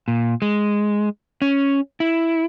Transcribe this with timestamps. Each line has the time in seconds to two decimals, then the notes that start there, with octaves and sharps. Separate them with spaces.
0.08 A#2
0.42 G#3
1.42 C#4
2.00 E4